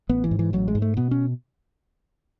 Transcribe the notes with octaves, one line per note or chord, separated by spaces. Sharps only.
A1 B3
E3
G#2
E3
A1 F#3
G#3
G#2
A3
B2 B3
C#4